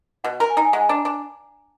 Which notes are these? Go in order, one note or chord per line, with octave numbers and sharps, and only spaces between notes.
B2 F#5
A#4
G#5
D#4 A#5
G#5
G#3 F#5
G#5
D4 A#5
D4